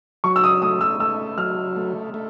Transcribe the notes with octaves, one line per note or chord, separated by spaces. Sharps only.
F#3 C#6
E6
D#6
A3 D#6
E6
A3 E6
F#3 F6
A3
A3